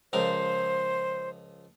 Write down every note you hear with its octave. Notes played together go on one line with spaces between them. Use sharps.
C#2 F3 A#4 C5